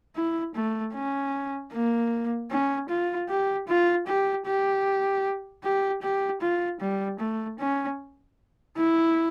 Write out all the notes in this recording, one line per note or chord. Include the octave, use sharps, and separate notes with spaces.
E4
A3
C#4
A#3
C#4
F4
G4
F4
G4
G4
G4
G4
F4
G3
A3
C#4
E4